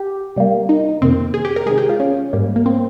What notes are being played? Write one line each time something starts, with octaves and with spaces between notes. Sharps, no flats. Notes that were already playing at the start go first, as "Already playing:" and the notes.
Already playing: G4
C3 G3 A#3
D#4
F2 C3 D#3 A#3 C4
G#4
G4
A#4
C3 D#3 G#3 G#4
G4
F4
C#4
G#2 G3 A#3
A#3
C4